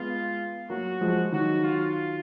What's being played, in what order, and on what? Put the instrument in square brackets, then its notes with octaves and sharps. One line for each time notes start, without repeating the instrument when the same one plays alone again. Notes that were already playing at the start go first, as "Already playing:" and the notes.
Already playing: [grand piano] G#3 B3 [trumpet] F4
[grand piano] F#3 A#3 [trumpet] F#4
[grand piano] F3 G#3
[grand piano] D#3 F#3 [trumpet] F#4
[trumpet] F4